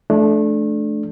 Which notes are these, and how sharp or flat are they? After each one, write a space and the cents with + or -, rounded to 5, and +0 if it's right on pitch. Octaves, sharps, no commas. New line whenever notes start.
F3 -45 A3 -20 D4 +0